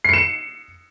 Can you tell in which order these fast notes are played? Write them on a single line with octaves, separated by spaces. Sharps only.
C7 C#7 E7